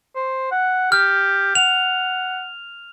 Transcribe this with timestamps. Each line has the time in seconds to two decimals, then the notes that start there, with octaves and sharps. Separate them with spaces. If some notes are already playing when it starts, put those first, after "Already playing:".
0.15 C5
0.51 F#5
0.92 G4 F6
1.55 F#5 F7